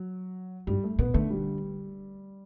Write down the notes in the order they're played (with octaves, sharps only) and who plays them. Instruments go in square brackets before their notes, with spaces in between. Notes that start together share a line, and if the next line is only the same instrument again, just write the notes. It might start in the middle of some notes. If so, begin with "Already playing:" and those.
Already playing: [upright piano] F#3
[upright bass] G2 [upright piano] G3
[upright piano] A3
[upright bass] B2 [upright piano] B3
[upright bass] D3 [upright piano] A3
[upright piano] G3